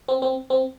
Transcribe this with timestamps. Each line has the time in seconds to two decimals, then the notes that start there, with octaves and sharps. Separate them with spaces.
0.08 C4
0.22 C4
0.50 C4